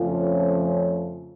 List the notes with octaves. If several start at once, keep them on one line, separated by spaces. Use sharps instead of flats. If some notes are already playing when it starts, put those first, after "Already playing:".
Already playing: F2 C#3 F3 A3 C#4 F4